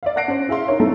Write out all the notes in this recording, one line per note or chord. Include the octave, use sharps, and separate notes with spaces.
D5 E5 F5
F#5 A5 F#6 A#6 C7 D7
C#4 C5
E4 G#4 E5 F5 C6
D#4 A#4 C#5
A3 C4 D#4 E4 A4